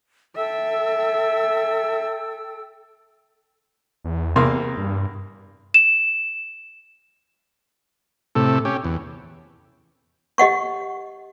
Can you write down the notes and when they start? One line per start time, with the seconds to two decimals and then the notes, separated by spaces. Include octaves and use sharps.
0.36 A4 E5 G5 E6
4.04 E2
4.36 E2 C3 A#3 C6
4.77 G2
5.74 E7
8.35 A2 C3 A4
8.65 C#4 G4
8.84 E2
10.38 G4 D#5 F#5 C#6